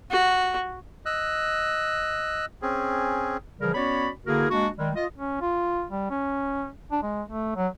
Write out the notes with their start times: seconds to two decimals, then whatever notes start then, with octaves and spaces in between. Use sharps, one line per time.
0.11 F#4
1.06 D#5 E6 F#6
2.62 C4 C#4 G#4
3.60 C#3 E3 F3 G3 G#4 A#4
3.74 B3 C#4 F#4 C#5 D5 B5
4.26 D3 A#3 E4 F#4 G#4 A#4
4.50 G#3 A#3 D4 F#4
4.78 D#3 G3 G#3
4.96 F4 D#5
5.18 C#4
5.41 F4
5.91 G3
6.10 C#4
6.91 D4
7.03 G#3
7.28 A3
7.56 F#3